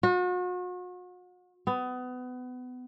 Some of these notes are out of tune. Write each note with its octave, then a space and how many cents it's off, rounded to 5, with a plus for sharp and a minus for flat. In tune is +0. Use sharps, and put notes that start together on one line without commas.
F#4 -40
B3 +25